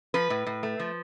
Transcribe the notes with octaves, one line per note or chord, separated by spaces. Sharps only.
F3 B4
A2
A2
A3
F3